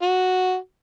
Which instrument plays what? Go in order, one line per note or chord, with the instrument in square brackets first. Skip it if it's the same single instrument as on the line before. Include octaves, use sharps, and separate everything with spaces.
[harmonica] F#4